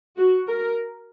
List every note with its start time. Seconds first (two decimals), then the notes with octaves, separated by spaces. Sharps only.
0.18 F#4
0.47 A#4